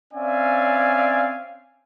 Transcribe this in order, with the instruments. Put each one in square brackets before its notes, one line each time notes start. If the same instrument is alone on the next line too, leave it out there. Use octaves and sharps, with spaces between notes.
[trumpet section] C4 C#4 D5 E5 F5 G#5